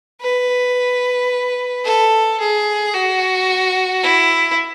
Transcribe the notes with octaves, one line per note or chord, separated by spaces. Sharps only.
B4
A4
G#4
F#4
E4